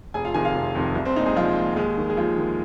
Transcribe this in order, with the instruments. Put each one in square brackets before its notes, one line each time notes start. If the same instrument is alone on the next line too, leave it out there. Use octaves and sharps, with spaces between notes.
[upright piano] F1 G#4 G#5
F4 F5
F2 C3 D#3 G#4 G#5
F4 F5
F1
F2 C3 D#3
C2
C4 C5
A#2 D#4
G#3 G#4
C2 F3 F4
A#2
D#2 G#3 G#4
D#3
G#4
D#2 F3 F4
D#3